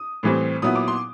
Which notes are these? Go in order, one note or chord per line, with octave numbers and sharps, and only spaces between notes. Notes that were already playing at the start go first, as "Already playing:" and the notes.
Already playing: D#6
A2 E3 G3 C4
A#2 F#3 B3 E4 D#6
D6
C6